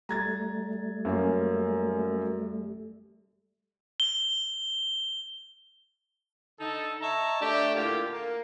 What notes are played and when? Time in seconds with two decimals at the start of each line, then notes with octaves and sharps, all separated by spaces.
0.09 G3 A3 A#5 G#6 A6
1.05 F#2 A#3 C#4
4.00 G7
6.60 D3 D#4 A4
7.01 C#5 D#5 E5 A5 A#5
7.41 A3 D4 G4
7.76 A2 D3 A#3 F4 G4
8.12 A#3